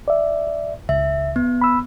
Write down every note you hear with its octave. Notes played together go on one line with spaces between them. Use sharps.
D5 E5
C#2 E5
B3
B5 E6